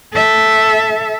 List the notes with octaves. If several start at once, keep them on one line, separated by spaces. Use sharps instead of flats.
A4 E5